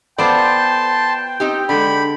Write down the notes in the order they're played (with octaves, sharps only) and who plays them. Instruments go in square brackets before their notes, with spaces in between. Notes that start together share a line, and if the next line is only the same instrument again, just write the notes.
[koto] B3 C5 [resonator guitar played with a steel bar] F4 A4 D5 [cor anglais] G5 [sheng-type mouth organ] A5 C6
[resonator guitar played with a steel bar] C4 D#4 G4
[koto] D3 G#3 [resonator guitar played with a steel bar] D4 [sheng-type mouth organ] B5